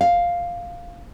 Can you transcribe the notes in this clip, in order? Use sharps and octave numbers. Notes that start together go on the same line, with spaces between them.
F5